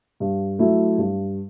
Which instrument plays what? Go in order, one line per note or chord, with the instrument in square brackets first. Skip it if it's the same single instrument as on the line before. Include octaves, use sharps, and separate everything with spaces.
[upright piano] G2
F#3 A3 E4
G2